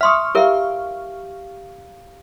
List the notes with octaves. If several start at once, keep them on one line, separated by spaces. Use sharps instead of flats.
E5 F5 C6 C#6 D#6 F6
E4 G4 A#4 E5 F5